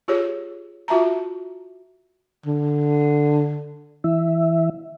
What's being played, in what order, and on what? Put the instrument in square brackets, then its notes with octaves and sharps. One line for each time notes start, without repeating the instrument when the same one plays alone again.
[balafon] F4 G4 G#4 C#5
F4 F#4 E5 A5 A#5
[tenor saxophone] D3
[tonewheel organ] E3 E5